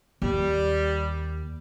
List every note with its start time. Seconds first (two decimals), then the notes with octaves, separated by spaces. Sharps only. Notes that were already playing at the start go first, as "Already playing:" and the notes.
0.22 D#2 G3